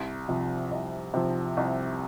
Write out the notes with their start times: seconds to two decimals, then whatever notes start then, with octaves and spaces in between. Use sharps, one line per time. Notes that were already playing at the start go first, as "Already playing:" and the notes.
Already playing: C2
0.29 C3 F3
0.72 C2
1.14 C3 F3
1.57 C2